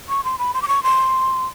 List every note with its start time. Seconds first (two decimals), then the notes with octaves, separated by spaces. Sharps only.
0.09 C#6
0.24 C6
0.39 B5
0.54 C6
0.62 D6
0.68 C#6
0.83 C6